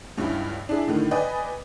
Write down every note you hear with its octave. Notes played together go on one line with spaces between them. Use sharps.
C#2 G2 C#4 E4
D4 E4 G#4
A2 D3 D#3
B4 D5 D#5 G5 G#5